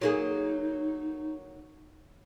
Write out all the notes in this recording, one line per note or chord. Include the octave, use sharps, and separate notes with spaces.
F#3 A#3 D#4 G#4